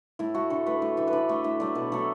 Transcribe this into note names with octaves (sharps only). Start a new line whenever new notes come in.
A2 E4
A3 F#4
D3 A4
A3 B4
A2
E3 A3 E5
B4
D3 D5
A3 E5
A2 E5
F#3 A3 D5
B2 B4
F#3 A3 A4